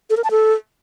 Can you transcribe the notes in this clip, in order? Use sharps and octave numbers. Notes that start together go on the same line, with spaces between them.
A4
A#4
A5
A4